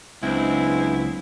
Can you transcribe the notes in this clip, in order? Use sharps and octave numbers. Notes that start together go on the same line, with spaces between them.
C#2 F#3 G#3 B3 C4 D4 E4